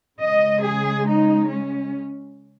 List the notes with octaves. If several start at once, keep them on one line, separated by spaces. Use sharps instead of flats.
C#3 G#3 D#5
G#4
D#4
C#4